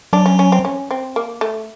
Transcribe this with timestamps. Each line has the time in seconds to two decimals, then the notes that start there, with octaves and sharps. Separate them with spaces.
0.13 F#3 D4
0.26 C#4
0.39 C#4
0.52 C4
0.65 C#4
0.91 C4
1.16 A#3
1.41 A3